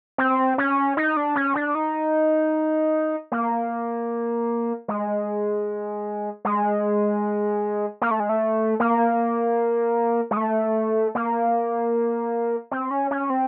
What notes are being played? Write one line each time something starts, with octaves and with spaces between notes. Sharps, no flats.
C4
C#4
D#4
D4
C#4
D4
D#4
A#3
G#3
G#3
A#3
A3
G#3
A3
A#3
G#3
A3
A#3
C4
C#4
C#4
C4